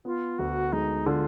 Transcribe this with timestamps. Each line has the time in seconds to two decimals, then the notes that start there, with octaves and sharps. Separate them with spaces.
0.05 B3 F4
0.38 D2 F#4
0.72 G#3 D#4
1.06 D3 F4